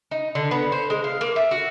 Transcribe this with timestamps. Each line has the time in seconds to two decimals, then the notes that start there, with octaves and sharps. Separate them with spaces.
0.11 D#4
0.35 D3
0.51 B3
0.72 C5
0.90 G#3
1.04 F5
1.21 A#3
1.36 E5
1.51 F#4